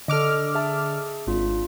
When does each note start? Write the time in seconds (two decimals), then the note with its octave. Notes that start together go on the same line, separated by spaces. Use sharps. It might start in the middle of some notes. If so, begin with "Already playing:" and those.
0.08 D3 A4 D#5 D6 F6
0.55 G#4 E5 A5
1.27 G#1 C4 D4 F4